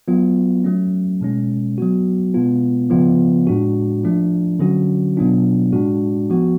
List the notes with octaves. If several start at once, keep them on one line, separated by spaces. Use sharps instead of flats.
F#3 B3 F4
F#3 A3 C#4
B2 G#3 C#4
F#3 B3 F#4
B2 G#3 B3 F4
C#3 F3 B3 F4
A2 G#3 D4 F#4
F3 A3 D4 F4
D3 F#3 C#4 F#4
B2 F#3 B3 D4 F4
A2 G#3 D4 F#4
F3 B3 F#4